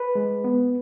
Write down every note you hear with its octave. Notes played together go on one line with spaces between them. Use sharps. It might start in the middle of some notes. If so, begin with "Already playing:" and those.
Already playing: B4
G#3
B3